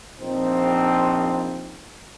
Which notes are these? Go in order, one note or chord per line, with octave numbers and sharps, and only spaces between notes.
A#1 F3 C4 D#4 C5